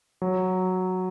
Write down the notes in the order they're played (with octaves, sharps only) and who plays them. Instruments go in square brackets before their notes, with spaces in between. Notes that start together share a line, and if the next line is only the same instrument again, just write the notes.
[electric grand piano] F#3